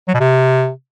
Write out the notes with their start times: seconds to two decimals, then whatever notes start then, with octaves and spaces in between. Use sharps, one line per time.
0.08 F#3
0.14 B2
0.20 C3